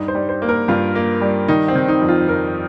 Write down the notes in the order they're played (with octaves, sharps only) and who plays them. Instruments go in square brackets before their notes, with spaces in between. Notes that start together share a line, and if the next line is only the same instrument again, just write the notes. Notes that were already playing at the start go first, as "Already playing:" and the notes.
Already playing: [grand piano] G2 D#4
C5
G3
C5
A#3
A#4
G2 F4
A#3
G3
D#3 D#4
C4
D#3
D#4
F2
F4
F2 A#4